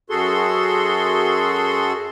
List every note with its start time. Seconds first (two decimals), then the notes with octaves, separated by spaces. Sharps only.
0.10 F#2 F#4 G#4 A4 C6